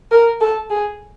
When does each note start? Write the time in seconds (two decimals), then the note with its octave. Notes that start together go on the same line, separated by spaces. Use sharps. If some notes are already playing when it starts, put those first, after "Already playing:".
0.11 A#4
0.41 A4
0.70 G#4